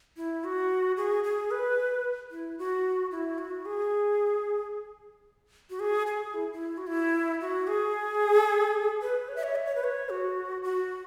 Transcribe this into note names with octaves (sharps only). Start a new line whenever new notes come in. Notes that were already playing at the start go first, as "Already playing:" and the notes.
E4
F#4
G#4
G#4
B4
E4
F#4
E4
F#4
G#4
F#4
G#4
G#4
E4
E4
F#4
E4
F#4
G#4
B4
C#5
E5
C#5
E5
C#5
B4
C#5
F#4
F#4